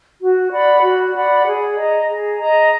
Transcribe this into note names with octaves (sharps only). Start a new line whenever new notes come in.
F#4
D5 F#5 B5
F#4
D5 F#5 B5
G#4
D#5 A#5
G#4
D#5 A#5